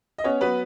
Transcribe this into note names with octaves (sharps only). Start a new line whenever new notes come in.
D#5
B3 C#4 C#5
F#3 B3 B4